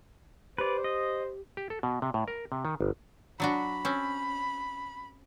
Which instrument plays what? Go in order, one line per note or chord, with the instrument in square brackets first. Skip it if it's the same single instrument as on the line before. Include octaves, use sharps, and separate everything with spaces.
[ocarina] G4 [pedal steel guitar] B4 D5 [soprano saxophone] C5
[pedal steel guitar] D#5
[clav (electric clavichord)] G4
A4
B2
C3
A2
A#4
C3
D#3
G1
[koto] F#3 D4 F#4 [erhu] B5
[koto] C4 C#4